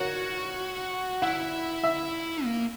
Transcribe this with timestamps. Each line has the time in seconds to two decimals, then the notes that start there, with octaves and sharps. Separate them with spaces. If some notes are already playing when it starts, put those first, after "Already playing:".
Already playing: F#4 A#4 C#5
1.22 E4 F#5
1.84 E5
2.44 A#3